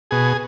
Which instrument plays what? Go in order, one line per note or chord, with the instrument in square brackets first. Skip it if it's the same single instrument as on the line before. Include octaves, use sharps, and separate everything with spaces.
[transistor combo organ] B2 G#4